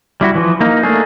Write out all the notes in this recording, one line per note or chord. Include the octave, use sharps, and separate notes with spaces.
G3 E4 F#4
E3 F3
A#3 D#4
A3 A#3 D4 G#4